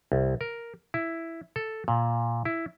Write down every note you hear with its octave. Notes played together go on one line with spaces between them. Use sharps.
C2
A#4
E4
A4
A#2
E4